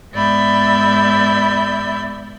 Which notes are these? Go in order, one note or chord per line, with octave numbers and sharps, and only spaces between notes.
G#2 B3 D5 E5 B5 G6